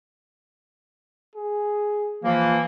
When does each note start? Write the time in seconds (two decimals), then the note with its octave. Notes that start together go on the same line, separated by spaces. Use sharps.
1.35 G#4
2.24 E3 F3 A#3